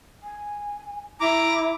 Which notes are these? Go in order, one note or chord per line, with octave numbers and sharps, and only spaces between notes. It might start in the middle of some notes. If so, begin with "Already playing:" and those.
G#5
E4 A#5 D6